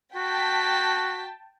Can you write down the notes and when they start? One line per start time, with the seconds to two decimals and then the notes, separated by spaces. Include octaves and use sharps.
0.16 F#4 G5 A5 B6